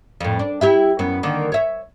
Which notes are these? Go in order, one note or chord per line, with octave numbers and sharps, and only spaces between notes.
F2 A2
D4
E4 G4 E5
F#2 B3
D3 D#3 A#3
C#5 E5